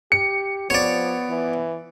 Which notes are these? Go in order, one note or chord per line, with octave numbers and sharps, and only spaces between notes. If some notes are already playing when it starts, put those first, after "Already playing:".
G4 C#7
F3 B3 C#5 D5
E3